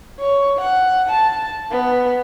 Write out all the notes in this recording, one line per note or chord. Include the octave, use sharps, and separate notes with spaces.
C#5
F#5
A5
B3